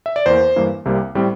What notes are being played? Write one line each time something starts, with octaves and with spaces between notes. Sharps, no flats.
E5
D5
E2 E3 A#3 C5
G2 E3 A#3
C2 C3 G3 A#3
A2 G3 C4